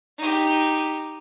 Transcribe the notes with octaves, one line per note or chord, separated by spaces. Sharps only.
D#4 G4